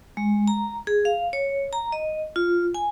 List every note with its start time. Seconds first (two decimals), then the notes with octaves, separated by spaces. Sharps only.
0.17 G#3
0.48 A#5
0.87 G#4
1.05 F5
1.33 C#5
1.73 A#5
1.92 D#5
2.36 F4
2.74 G#5